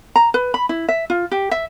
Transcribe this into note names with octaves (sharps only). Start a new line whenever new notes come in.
A#5
B4
B5
E4
E5
F4
G4
E5